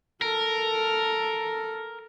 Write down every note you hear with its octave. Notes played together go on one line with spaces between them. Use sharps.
A4 A#4